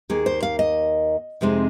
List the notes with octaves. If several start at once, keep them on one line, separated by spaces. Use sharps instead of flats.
D#2 D#3 A#3 G#4
C5
F5
D#5
F2 C3 G#3 C4 D#4